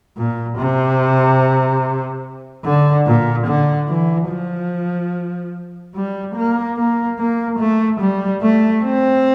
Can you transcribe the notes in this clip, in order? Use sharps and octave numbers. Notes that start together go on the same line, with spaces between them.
A#2
C3
D3
A#2
D3
E3
F3
G3
A#3
A#3
A#3
A3
G3
A3
C4